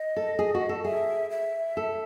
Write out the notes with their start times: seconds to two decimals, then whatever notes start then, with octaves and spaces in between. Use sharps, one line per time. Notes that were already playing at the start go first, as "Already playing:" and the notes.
Already playing: D#5
0.16 A4
0.39 G#4
0.55 F#4
0.69 A4
0.84 G#4 E5
1.30 E5
1.77 A4